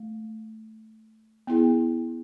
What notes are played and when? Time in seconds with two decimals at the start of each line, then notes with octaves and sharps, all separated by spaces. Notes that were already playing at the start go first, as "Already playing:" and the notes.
Already playing: A3
1.47 B3 E4 G#4